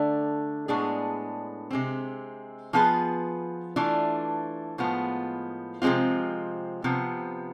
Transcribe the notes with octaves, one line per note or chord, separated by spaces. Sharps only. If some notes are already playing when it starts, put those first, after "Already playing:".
Already playing: D3 A3
A2 G#3 B3 D4 G#4
C3 G#3 C4
F3 B3 F4 G#4 B4
E3 A3 D4 F4
A2 F3 G#3 B3 F4
C3 F3 G#3 C4 F4
C3 F3 B3